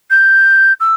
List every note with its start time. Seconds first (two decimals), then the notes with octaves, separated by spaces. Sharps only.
0.10 G6
0.80 E6